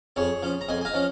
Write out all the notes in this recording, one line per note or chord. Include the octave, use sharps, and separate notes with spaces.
F2 G#4 C#5
F3 C#4
A#5
F2 D#5 G#5
G#5
F5 A#5
F3 C#4